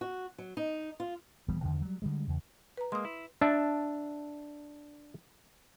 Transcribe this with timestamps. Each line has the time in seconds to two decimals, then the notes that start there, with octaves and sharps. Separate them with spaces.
0.01 F#4
0.38 F#3
0.57 D#4
1.00 F4
1.48 D#1 E3 G3 B3
1.63 E2 G2 D3 D#3
1.82 F#3 G3
2.02 D3 G3 G#3
2.28 E2 C#3
2.77 B4 A#5
2.92 G#3 A#3 C6 D#6
3.05 E4
3.41 D4 E5 A5